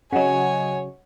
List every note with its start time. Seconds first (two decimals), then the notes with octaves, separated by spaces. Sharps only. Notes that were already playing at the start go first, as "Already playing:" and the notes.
0.13 C#3 F#3 C#5 D#5 F#5 G#5